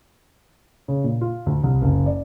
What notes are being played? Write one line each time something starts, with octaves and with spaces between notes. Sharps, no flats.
C#3
A#2
F4
D2
C2
F#1
D5